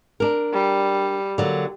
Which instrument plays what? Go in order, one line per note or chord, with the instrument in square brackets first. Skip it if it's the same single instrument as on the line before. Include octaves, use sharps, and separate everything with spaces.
[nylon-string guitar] D4 A#4
[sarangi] G3
[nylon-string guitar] D3 F#3 A#3